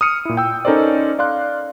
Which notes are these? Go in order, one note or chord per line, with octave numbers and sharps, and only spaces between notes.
D#6 F6 C#7 D#7
A#2 E4
G5 E6
C#4 D#4 A4 A#4 C5 D5
D5 F5 C6 F#6